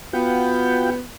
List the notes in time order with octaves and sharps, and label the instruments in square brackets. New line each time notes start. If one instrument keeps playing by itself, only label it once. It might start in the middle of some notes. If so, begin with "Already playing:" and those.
[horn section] B3 [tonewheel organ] F4 F#4 G5